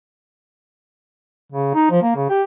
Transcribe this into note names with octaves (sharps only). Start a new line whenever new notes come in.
C#3
D#4
F3
A#3
C#3
G4